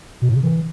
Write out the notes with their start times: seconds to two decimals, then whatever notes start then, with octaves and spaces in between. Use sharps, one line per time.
0.22 B2
0.29 A2
0.36 C#3
0.43 E3